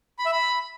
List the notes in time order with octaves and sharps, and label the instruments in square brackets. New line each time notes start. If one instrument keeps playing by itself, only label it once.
[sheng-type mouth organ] B5
E5
B5